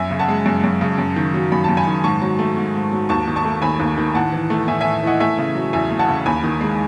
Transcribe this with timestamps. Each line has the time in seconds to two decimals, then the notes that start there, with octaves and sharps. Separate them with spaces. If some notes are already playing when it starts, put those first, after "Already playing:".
Already playing: F#2 E5 G#5
0.11 C#3
0.19 F#5 A5
0.28 G#3
0.46 F#2
0.64 F#2
0.81 C#3
0.98 F#2
1.16 D#3
1.34 F#3
1.52 F#2 B5
1.64 F#2 A5
1.77 G#5 B5
1.87 D#3
2.04 G#2 A5 C#6
2.22 F#3
2.39 A3
2.57 G#2
2.74 G#2
2.92 F#3
3.09 D#2 A5 C#6
3.27 D#3
3.36 A5 C#6
3.45 A3
3.62 D#2 G#5 B5
3.80 D#2
3.98 D#3
4.15 A2 F#5 A5
4.33 E3
4.50 A3
4.67 A2 E5 G#5
4.81 A2 E5 G#5
5.03 E3 D#5 F#5
5.20 A3 E5 G#5
5.38 C#3
5.55 F#3
5.73 E2 E5 G#5
5.90 A3
5.99 F#5 A5
6.08 C#3
6.26 D#2 G#5 B5
6.44 D#3
6.61 G#3